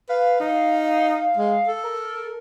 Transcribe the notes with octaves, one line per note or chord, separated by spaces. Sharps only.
B4 F5
D#4
G#3
A4
A#4